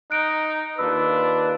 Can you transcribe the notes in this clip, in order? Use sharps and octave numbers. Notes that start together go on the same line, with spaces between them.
D#4 F#6 D7
D#2 D4 F4 B4 E6